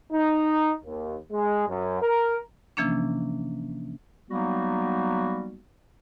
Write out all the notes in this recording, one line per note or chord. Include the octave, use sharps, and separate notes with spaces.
D#4
D#2
G#3
F#2
A#4
C3 E3 F3 A#3 C#4 D4
F#3 G3 A#3 B3 D#4 F#4